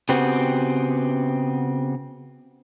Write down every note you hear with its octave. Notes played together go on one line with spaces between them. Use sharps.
C#3 B3 C4 F#4 G4